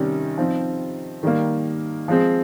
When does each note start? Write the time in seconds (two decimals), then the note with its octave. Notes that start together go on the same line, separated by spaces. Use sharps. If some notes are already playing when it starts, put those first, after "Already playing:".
Already playing: C3 D#3 G3 C#4
0.38 F3 C4 D#4
1.23 D#3 G3 A#3
2.08 F3 G#3 C4